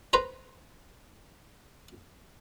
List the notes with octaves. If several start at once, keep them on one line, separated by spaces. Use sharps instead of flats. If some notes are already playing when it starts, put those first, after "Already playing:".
B4 C5 A#5